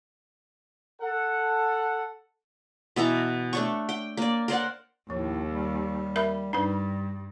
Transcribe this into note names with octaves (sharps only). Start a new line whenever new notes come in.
A4 F#5
B2 E3 A5 A#5
A3 D4 C#6
G5
A#3 D5
A#4 C5 D5 F#5
D#2 A2 F3
G3
A#4 E5 B5
G2 G3 D4 D#4 B4